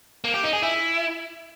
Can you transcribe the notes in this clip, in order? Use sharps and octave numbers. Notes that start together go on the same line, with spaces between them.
A#3
G4
D#4
G#4
E4